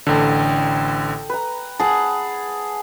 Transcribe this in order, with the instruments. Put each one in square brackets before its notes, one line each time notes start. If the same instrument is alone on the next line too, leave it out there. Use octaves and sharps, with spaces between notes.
[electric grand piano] A1 D3 [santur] A4 G5
[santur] B4 A#5
[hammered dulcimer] G#4 F#5 [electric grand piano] A5